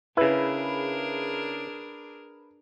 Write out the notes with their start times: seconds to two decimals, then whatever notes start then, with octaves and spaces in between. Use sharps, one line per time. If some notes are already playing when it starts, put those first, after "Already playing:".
0.17 C#3 D4 E4 G#4 A#4 B4